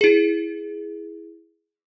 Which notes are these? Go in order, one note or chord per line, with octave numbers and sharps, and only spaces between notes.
E4 G#4